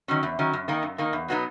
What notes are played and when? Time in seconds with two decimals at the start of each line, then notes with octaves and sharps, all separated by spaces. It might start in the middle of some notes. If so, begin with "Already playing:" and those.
0.08 D#3 F#3 C#4
0.23 E2
0.39 D#3 F#3 C#4
0.53 F#2
0.68 D#3 A#3 D#4
0.83 F#2
0.98 D#3 A#3 D#4
1.13 E2
1.28 B2 F#3 B3 D#4